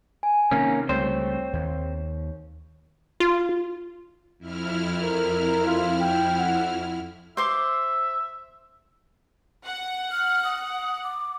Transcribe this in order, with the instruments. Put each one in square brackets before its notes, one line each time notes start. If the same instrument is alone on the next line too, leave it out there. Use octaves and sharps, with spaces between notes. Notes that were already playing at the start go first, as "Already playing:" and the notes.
[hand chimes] G#5
[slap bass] C3 D#3 [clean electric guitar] A#3 C#4
[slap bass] C#2 G3 A3 [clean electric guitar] C4 C5 [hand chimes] C#5
[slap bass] D#2
[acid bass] F4
[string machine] F2 E4 F6
[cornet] A#4
F4
G5
F#5
[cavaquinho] C5 C6 D6 [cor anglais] E5
[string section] F#5
[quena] F6
D#6
D6